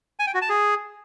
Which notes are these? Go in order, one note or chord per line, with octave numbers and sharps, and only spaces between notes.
G#5
G5
F#4
A5
G#4